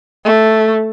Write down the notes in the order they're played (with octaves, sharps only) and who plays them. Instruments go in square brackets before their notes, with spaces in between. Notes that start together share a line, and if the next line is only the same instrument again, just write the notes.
[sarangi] A3